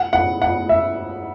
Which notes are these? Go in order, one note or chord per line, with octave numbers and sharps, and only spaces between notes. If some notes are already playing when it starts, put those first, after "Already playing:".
Already playing: F#5
F#5
F#5
E5